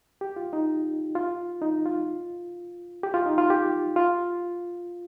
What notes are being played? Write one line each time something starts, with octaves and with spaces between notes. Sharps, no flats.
G4
F4
D#4
F4
D#4
F4
G4
F4
D#4
F4
G4
F4